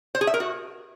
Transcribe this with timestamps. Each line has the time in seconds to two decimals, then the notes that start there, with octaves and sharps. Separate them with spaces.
0.15 C5
0.21 G#4
0.27 E5
0.34 A#4
0.40 F#4